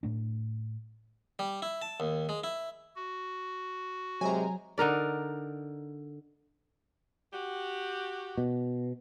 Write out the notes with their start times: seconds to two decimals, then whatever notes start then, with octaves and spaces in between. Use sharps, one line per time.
0.03 A2 A3 D4
1.39 G3
1.62 E4
1.82 A5
2.00 D#2
2.29 G#3
2.44 E4
2.96 F#4
4.21 C3 F#3 G#3 G#5 A#5
4.78 D3 D#4 A#4 D5
7.33 F#4 G4
8.37 B2